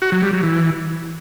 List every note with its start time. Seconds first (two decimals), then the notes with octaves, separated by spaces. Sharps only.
0.02 F#4
0.12 F#3
0.22 G3
0.33 F#3
0.43 E3